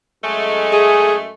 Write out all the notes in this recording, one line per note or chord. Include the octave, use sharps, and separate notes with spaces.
F#2 G#3 A3
G#4